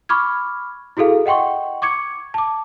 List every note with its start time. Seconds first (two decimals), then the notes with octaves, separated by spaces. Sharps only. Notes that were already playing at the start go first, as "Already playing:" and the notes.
0.09 B5 C#6 D6 F6 G#6
0.97 E4 F#4 G#4 A4 F5
1.26 D#5 F#5 G5 C6 C#6
1.82 C#6 D6 G#6 C#7
2.34 A5 D6